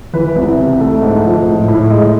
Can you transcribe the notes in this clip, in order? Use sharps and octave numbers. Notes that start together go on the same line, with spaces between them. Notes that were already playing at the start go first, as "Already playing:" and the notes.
E3 B4
C2
C3
A3
G#2
F3
A2
A2
G#3